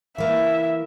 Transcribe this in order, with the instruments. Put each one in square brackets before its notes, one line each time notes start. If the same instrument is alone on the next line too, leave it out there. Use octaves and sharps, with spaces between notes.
[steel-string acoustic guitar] E3 A#3 [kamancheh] E5